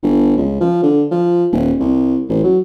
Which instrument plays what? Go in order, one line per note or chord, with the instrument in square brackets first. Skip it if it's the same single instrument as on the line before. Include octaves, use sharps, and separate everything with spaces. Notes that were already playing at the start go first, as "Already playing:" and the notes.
[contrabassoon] G1
C#2
F3
D3
F3
D#1
C2
A1
F#3